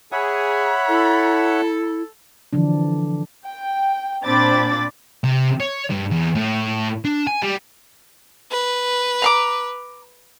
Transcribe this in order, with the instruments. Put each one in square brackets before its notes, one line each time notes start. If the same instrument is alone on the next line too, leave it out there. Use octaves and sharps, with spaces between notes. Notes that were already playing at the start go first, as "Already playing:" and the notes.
[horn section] G#4 [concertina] C#5 E5 F#5 [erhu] B5
[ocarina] E4 [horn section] A4
[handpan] D3 E3 F3 D4
[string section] G5
A#2 C4 D4 B5 D6 A6
[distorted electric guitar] C3
C#5
G2
E2
A2
D4
G#5
G3
[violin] B4
[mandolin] A#5 C6 D6